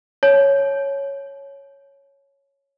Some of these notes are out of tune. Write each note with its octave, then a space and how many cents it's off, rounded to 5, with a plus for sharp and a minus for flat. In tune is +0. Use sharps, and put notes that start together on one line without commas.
C#5 +0 A5 -35